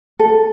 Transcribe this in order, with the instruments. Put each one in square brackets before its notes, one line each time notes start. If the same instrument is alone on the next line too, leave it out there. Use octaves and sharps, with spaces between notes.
[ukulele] A4